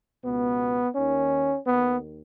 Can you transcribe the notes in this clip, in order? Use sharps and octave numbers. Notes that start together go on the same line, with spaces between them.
C#2 B2 B3
D#2 D#3 C#4
D#2 D#3 B3